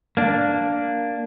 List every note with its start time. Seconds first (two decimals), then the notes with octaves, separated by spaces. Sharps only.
0.17 A#3 D4